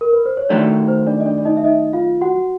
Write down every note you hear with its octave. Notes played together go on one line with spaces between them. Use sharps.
A#4
B4
C5
C#5
D#3 F#3 A3 D4 D5
C5
D4 D5
D#5
D4 D5
D5
D#4 D#5
E5
D#4 D#5
F4 F5
F#4 F#5